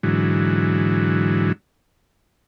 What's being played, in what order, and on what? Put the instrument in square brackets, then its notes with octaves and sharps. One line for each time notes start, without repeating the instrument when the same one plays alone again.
[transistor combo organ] G#2 D3 E3 F#3